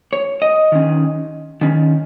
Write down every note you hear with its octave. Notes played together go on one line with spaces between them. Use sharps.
C#5
D#5
D#3 C#4
D#3 C#4